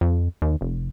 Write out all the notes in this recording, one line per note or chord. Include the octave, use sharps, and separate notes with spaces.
F2
D#2
F1